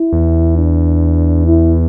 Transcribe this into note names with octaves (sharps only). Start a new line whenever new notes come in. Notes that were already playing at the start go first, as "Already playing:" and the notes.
Already playing: E4
E2
D4
E4